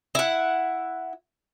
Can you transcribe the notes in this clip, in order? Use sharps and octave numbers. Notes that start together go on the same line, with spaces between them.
E4 F#5